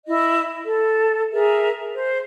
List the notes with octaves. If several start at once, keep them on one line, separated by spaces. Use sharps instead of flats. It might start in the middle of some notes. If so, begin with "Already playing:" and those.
E4 D#5
A4
G#4 A#4 E5
C5